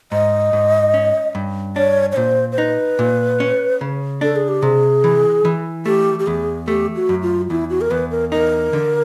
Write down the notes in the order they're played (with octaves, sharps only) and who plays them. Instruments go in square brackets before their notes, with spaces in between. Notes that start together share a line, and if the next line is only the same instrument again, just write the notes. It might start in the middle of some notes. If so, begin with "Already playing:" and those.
[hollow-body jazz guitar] G#2 [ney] D#5
[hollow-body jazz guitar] G#2
C#4
G2
[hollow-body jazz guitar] D4 [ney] C#5
[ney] C#5
[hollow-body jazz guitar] A#2 [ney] C5
[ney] C5
[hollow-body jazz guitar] D#4 [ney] B4
[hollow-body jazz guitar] A#2
C#4
C#3
[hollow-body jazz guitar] D4 [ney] A4
[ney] G#4
G4
[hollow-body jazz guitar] C3 [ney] G#4
[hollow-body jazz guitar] E3
E3
[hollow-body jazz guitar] A3 [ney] G4
[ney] G4
[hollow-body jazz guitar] E2 [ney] G#4
[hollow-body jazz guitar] A3 [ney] G4
[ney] F#4
[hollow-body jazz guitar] F#2
[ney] F4
[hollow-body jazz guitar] E2 [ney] E4
[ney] F#4
A#4
[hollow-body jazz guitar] E2 [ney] B4
[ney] A#4
[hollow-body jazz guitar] D#4 [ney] A#4
[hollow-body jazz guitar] D3